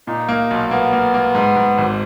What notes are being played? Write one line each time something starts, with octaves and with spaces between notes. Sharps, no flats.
A#2 D#4
A#3
B1
A#3 B3
A#3
A#3
G#2
G#2
G#1